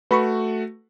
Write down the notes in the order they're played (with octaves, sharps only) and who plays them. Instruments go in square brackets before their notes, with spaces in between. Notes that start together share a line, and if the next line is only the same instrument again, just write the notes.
[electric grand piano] A3 F#4 [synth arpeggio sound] B4 B5 C#6